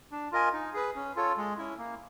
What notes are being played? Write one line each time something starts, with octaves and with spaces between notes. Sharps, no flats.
D4
F4 A#4 D#5 G#5
D#4
G#4 B4
C#4
F4 A4 C#5
G#3
C#4 E4
A#3